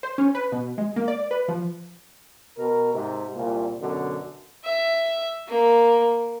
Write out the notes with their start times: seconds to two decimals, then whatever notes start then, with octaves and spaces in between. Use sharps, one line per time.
0.03 C5
0.18 C#4
0.35 B4
0.52 B2
0.78 G#3
0.96 A#3
1.08 D5
1.31 B4
1.48 F3
2.58 B2 A#4
2.93 G#2 C3
3.35 C2 A#2
3.81 F#2 B2 D3
4.64 E5
5.48 A#3